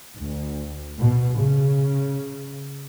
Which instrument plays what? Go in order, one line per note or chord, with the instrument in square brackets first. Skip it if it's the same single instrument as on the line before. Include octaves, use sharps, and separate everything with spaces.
[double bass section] D2
B2
C#3